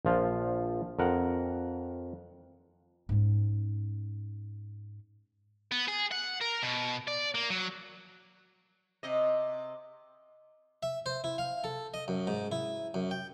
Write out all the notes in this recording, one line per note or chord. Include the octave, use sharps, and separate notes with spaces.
A#1 F3 F4
F2 A#4 F#5
G#2 C#4
B3
G#4
F#5
A#4
B2
D5
A#3
F#3
C3 D#5
E5
C5
E4
F5
A4
D#5
F#2
G#2
E4
F#2
G5